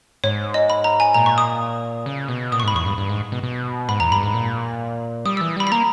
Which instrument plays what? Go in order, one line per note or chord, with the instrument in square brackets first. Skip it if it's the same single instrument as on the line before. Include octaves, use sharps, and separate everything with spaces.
[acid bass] G#2 [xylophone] C#5
[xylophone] D#5
B5
A#5
G#5
[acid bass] A#2 [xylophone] A#5
[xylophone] C#6
D#6
[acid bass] C#3
B2
[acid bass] A#2 [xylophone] D#6
[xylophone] C#6
[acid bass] G#2 [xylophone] B5
[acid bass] E2 [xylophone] C#6
[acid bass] G2
G2
G#2
B2
B2
[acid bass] G#2 [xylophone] B5
[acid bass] E2 [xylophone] A#5
[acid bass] G2 [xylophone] B5
[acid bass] G#2
A#2
[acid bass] G3 [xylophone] D#6
[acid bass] E3 [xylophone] E6
[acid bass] G3 [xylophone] B5
[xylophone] B5
[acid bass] A#3 [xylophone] A#5